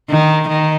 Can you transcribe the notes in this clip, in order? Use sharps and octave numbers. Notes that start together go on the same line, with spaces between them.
D#3
D#3